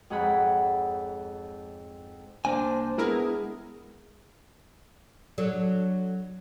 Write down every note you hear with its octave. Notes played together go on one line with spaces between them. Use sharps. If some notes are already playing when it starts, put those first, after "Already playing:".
F2 G#2 G#4 C#5 F#5 B5
C2 A#3 D4 C5 G#5
G#3 B3 E4 G#4 A#4
F#3 D4 A4